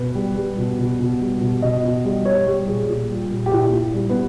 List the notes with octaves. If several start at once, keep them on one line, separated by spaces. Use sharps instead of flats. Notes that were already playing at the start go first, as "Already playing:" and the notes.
Already playing: B2 B4
G3
G3
B2
B2
B2
G3
B2
B2 D#5
B2
G3
G3 C#5
G3
A#2 G#4
A#2
G3
A#2
G4
A#2 E4
A#2
G3
B3